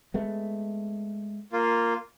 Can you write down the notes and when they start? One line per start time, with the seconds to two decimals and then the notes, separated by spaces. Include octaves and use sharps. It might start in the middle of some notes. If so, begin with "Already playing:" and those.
0.14 G#3 A3 B3
1.53 A#3 F4